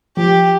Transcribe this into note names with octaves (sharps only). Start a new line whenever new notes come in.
F3 G4